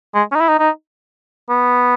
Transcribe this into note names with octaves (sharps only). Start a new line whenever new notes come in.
G#3
C#4
D#4
E4
D#4
D#4
B3